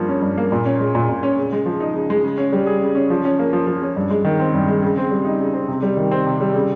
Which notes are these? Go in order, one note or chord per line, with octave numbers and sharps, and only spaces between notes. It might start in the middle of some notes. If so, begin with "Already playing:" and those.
Already playing: G2 F3 A#3
C#4
G2
A#3
A#2
C#4
G#3
A#2
A#2
C#4
C#3
G#3
F3
D#4
C#3
G#3
C#3
C#4
G3
G#4
C#3
C#4
F3
C#4
A#3
F3
F3
C#4
G2
G#3
D#3
C4
G2
G#3
C#3
C4
G3
D#4
C#3
C4
C3
G3
D#3
C4
C3
G3
C#3